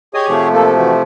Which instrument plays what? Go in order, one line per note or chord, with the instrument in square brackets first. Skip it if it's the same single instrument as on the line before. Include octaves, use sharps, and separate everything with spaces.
[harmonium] G4 G#4 C#5 [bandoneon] D#5 G#5 D#6
[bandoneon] C3 F3 A3
[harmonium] A#3 A4
E3 F#4